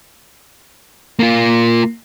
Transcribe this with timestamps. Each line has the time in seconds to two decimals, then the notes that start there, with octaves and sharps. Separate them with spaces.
1.19 A#3 F4